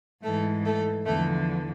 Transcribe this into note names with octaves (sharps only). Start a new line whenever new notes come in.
G#2 E3 A3 A4
A3 A4
E2 D3 F3 A3 A4